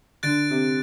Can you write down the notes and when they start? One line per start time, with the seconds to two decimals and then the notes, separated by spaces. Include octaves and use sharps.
0.23 D3 F#6 A6 D7
0.51 C3